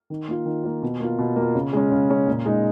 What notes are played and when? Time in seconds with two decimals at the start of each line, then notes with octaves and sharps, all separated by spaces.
0.10 D#3
0.28 A#3 F4
0.46 D#3
0.64 A#3 F4
0.83 B2
1.00 A#3 F4
1.19 B2
1.36 A#3 F4
1.55 C#3
1.73 G#3 C#4
1.91 C#3
2.10 G#3 C#4
2.27 A#2
2.46 G#3 D#4